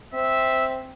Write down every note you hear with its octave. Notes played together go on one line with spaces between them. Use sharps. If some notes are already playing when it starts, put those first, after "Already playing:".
C4 E5